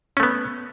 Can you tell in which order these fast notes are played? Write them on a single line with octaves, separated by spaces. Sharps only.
C#4 A3 B3